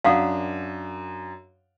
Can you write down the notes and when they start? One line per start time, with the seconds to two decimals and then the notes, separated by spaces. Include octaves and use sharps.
0.04 F#2 D4 F5 F#5 D#6